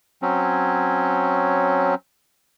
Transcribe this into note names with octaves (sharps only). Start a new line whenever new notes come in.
F#3 C4 C#4